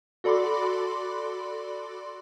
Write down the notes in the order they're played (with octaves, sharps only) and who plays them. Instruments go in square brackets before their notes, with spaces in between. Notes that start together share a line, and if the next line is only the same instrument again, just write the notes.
[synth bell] F#4 A4 D5 B5 C6 D6